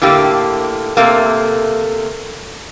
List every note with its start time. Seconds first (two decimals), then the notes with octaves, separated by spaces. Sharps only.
0.02 A2 D3 A#3 G4
0.97 C3 A3 A#3